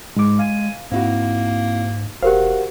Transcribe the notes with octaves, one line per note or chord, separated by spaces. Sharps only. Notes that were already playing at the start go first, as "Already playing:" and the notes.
G#2 G#3 D6
F5 G#5
G#2 A#3 C4 E4 F#4
E1 F#4 G4 A#4 C5 F5 F#5